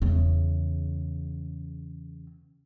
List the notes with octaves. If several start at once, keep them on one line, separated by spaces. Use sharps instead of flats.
E2 C#3